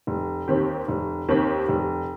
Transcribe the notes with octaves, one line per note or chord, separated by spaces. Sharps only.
F1
D#2 D#3 C4 G4
F1
D#2 D#3 C4 G4
F1